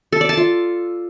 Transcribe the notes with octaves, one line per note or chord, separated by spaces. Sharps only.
A4
D5
A5
F4